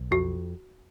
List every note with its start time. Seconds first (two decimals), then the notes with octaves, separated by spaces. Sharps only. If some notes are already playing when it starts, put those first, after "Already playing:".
Already playing: B1
0.11 F2 F#4